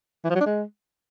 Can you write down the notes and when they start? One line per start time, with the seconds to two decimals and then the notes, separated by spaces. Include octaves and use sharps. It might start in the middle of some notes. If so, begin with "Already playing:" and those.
0.24 E3
0.30 F3
0.35 F#3
0.41 D4
0.46 G#3